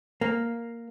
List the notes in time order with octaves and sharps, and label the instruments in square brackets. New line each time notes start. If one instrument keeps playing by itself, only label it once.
[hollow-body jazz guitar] A#3